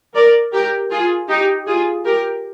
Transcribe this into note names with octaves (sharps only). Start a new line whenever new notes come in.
A#4 D5
G4 A#4
F4 G#4
D#4 G4
F4 G#4
G4 A#4